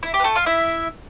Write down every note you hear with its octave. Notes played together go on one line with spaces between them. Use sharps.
E4
G4
B4
A3 A4
F4 F5
E4 E5